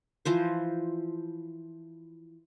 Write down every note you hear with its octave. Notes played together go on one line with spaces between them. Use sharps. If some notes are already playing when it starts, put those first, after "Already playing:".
E3 F3 C5